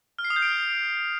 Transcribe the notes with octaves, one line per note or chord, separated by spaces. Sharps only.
F6
C7
D#6
G6
D7